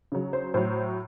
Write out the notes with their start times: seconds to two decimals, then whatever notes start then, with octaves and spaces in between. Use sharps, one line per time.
0.12 C#3 F#3
0.33 C5
0.54 A2 F#3 C5